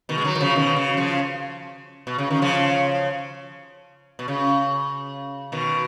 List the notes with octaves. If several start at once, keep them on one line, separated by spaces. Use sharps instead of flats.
B2 D#3
G#3
D#3 F#3
D#3
C#3 F3
B2 D#3
C#3
C#3 F3
B2
C#3
D#3
C#3 F3
B2
C#3
B2 D#3